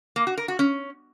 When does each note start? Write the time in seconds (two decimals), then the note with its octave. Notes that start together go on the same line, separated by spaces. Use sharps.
0.16 A#3
0.27 F#4
0.38 A#4
0.48 F#4
0.59 C#4